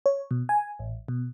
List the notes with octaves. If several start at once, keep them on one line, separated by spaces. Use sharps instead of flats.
C#5
B2
G#5
A1
B2